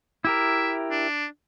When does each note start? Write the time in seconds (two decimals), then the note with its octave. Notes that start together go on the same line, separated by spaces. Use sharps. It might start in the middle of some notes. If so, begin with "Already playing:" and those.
0.25 E4 G4 A#4 E5
0.91 D4